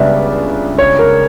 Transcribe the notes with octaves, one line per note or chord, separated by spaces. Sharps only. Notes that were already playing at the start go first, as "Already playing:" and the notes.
Already playing: C#2 C#3 G3 B3 D4 D5 E5
C#5
A#4